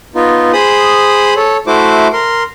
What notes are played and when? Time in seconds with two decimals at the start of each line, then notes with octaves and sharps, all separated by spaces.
0.15 B3 D#4 F4
0.53 G#4 C5 B5 D#6
1.36 A4 C#5
1.67 A3 E4 F#4 C5 D6
2.13 A#4 C6